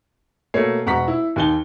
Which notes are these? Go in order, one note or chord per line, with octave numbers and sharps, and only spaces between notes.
B2 A3 A#3 C#5 C7
E1 F#5 A#5 C#6 B6
E4
D#2 G#5 G7